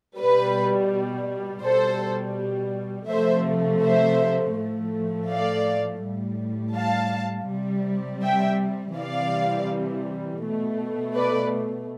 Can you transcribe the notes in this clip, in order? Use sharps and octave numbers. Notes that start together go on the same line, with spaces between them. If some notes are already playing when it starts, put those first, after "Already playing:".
B2 G3 B4
B2 G3 A4 C5
C3 F3 A3 C5 E5
C5 E5
A2 F3 A3
D5 F5
A2 G3
F5 A5
C3 G3
E5 G5
C3 E3 G3 D5 F5
B2 A3
B4 D5